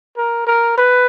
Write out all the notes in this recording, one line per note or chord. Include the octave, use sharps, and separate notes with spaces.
A#4
A#4
B4